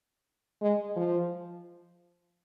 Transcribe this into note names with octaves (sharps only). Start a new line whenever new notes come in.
G#3
F3